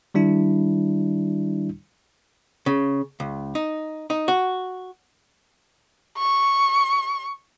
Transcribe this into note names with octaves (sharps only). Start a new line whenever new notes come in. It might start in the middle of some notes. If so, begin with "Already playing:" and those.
D#3 G3 D4 E4
C#3
C#2
D#4
D#4
F#4
C#6